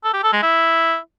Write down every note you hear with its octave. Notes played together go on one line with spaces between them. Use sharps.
A4
G4
A4
G#3
E4